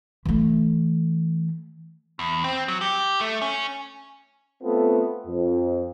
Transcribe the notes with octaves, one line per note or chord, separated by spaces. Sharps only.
E3 A3
E2
C4
F#3
G4
A3
C#4
A3 B3 C4 F4 A4
F2